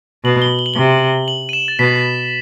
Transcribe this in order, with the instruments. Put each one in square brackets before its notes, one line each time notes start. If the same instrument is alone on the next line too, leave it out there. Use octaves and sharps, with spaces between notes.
[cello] B2 [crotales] F#7
[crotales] G7
G7
F#7
[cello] C3 [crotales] G7
[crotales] F#7
D#7
E7
A6
[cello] B2 [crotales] B6
[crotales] B6